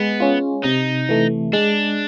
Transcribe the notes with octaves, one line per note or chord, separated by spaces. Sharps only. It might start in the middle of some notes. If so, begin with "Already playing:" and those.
Already playing: G#3 B3
C#4 F4
C3 D#4
E3 A3
G#3 D4